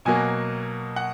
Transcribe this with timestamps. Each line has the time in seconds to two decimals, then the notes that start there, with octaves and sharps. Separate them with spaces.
0.05 B2 F#3 A#3 G#5
0.96 F#5